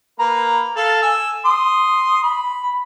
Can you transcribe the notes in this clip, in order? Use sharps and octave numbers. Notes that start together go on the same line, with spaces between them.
A#3 B4 A#5
A4 F5 A5
G#5 E6
C6 D#6
B5